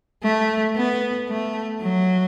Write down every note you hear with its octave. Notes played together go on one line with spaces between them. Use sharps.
A3
B3
A3
F#3